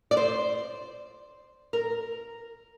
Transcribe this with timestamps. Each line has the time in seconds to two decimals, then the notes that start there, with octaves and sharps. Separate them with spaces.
0.11 D5
0.17 C5
1.73 A#4